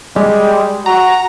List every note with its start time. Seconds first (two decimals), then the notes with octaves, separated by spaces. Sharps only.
0.16 G3 G#3
0.86 F#4 A#5